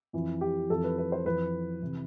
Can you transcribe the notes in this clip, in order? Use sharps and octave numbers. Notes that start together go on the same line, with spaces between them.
F2 E3
G4
F2 E3 A4
B4
B4
C5
F2 E3 B4
C3 E3